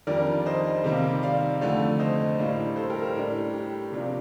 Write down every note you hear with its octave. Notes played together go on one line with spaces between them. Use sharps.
F2 D#3 G3 D4 A#4 D5
C5 D#5
C3 D#3 G3 A#3
D5 F5
F2 D3 A3 D4
C5 D#5
A2 G3 A#3 D4
A4 C5
G4 A#4
G4 A#4
A2 G3 D4
G4
C3 F3 A#3 D4